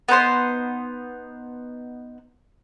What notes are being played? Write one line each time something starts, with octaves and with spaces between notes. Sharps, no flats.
B3 D#4 C5 C6